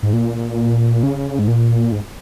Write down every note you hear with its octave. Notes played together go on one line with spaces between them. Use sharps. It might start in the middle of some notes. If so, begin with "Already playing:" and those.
G#2
A#2
C#3
G#2
A#2
G#2